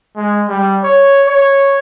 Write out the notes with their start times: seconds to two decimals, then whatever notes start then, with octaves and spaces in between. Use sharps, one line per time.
0.16 G#3
0.48 G3
0.84 C#5
1.27 C#5